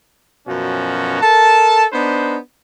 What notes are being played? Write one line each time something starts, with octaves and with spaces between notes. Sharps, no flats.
F#2 B2 F3 C#4 F#4
A4 A#4 A5
B3 D4 D#4 B4 C5